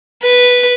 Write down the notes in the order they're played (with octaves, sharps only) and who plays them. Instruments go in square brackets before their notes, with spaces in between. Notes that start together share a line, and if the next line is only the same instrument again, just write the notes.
[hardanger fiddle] B4